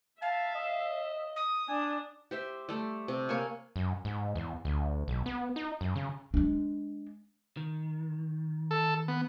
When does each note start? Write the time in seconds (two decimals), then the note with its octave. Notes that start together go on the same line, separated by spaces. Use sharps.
0.22 E5 F5 A5
0.55 D#5
1.36 D#6
1.68 D4 G#5
2.31 G4 C5 E5
2.69 G3 A3
3.08 C3
3.29 A#3 C#5 G#5
3.76 F#2
4.05 G#2
4.35 E2
4.65 D2
5.08 B1
5.26 B3
5.56 D#4
5.81 F#2
5.96 C#3
6.34 G#3 D4
7.57 D#3
8.71 A4
9.08 B3